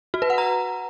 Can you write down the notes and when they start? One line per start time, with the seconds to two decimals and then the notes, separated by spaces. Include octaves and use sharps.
0.14 F#4
0.22 B4
0.30 F#5
0.38 A#5